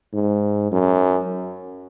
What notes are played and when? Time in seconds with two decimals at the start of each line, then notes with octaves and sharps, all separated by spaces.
0.13 G#2
0.71 F#2